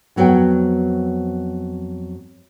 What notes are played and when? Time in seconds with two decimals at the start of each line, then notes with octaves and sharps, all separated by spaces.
0.16 F2 F#3 B3 C#5 G5